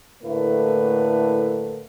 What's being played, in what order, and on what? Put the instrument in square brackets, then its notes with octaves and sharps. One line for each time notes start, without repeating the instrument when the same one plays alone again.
[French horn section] A2 D3 A3 A#3 E4 B4